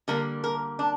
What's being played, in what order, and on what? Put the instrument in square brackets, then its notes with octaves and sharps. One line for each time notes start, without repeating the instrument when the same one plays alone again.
[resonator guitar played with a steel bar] D3 G3 A#3 A#4
A#4
D4